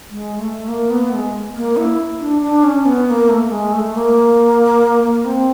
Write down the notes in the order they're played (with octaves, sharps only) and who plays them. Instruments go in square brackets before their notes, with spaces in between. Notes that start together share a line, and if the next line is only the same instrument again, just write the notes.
[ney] G#3
A3
A#3
B3
A3
G#3
A#3
E4
D4
D4
C#4
B3
B3
A#3
A3
G#3
A3
A#3
A#3
C4